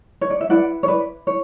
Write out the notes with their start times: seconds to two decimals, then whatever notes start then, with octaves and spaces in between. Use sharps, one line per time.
0.21 C#5
0.30 D5
0.41 E5
0.49 E4 B4 D5 F#5
0.83 C#5
0.88 B4 D5
1.27 C#5